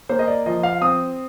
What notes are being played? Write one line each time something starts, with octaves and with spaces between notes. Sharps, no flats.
A#3 C5
D#5
D5
F3 D#5
F5
C4 D#6